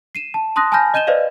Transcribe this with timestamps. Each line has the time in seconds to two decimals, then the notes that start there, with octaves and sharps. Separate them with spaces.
0.15 C7 D#7 E7
0.34 A5
0.56 A5 C6 D#6 F#6 A#6
0.72 G#5 A5 B5 F6 G6 A#6
0.94 D#5 G6 D#7 E7 G7
1.07 B4 C5 D5 D#5 F5